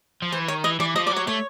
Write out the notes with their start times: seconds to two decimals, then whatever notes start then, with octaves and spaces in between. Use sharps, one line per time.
0.22 F3
0.32 E3 C5
0.48 D#3 C#5
0.64 E3 D#5
0.80 E3 D5
0.96 F3 D#5
1.07 D5
1.11 F#3
1.16 C#5
1.27 A3 C#5